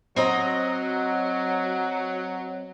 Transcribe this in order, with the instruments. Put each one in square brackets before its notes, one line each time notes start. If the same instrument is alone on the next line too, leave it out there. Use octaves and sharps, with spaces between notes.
[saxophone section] F#3 [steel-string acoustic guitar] C4 D#5 A#5